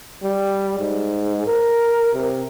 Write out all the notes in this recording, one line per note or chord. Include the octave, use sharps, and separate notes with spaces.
G3
G#2
A#4
C3